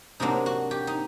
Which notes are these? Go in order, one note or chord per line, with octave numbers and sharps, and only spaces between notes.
C3 F#3 A#3 D4 D#4
F#4
G4
D#4